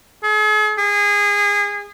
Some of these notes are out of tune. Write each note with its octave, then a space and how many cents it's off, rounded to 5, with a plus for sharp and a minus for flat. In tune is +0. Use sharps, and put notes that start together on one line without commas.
G#4 +40
G#4 -25